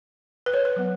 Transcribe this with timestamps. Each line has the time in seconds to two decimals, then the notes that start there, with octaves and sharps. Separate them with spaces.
0.46 B4
0.53 C#5
0.65 B4
0.76 F#3 B3